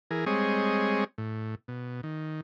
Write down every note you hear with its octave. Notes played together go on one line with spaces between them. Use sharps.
E3 G#4 A#4
G3 G#3 C4 G#4 C#5 D#5
A2
B2
D#3